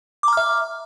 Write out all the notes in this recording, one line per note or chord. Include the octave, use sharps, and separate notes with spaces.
E5 A#5 D6 F6